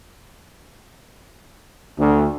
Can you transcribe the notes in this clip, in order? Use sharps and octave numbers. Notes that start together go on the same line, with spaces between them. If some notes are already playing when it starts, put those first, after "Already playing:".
D2